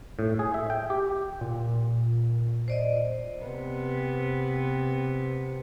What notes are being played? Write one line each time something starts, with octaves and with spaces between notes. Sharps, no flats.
A2
G#4
E5
G5
G4
A#2
C5 D5 D#5
C3 B3